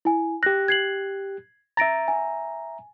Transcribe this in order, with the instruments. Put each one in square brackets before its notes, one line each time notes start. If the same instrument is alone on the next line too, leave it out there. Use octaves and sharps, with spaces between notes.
[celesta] E4 G#5
[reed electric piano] G4 F#6 [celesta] A#6
[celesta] G#6 C7 F#7
[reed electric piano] E5 A#5 [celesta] A6 A#6 D7
[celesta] G#5